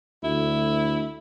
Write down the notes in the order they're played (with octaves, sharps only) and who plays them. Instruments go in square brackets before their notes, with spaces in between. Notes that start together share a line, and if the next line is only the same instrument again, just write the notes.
[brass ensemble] D2 [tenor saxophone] E4